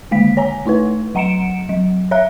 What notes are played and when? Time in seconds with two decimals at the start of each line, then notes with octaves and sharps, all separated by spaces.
0.11 D3 D#3 G#3 A#3 F5 B6
0.37 C#5 G#5 A#5
0.66 A3 D#4 E4 B4
1.15 F#3 F#5 A#5 C#7 D7 E7
1.69 F#3
2.11 C#5 E5 F5 A#5 F#6